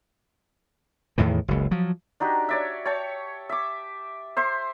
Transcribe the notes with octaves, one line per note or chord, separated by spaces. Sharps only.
E2 A2 D#3 E3
F#1 C#2
F3 F#3
D4 D#4 F#4 G4
C#5 D5 E5
C#5 G5 A5 C#6
E5 D6
C5 E5 C6 D6